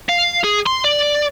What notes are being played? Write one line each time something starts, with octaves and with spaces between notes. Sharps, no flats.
F5
G#4
C6
D5